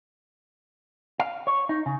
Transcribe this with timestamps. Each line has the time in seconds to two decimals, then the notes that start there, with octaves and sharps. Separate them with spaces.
1.19 F5
1.47 C#5
1.69 D#4
1.86 C#3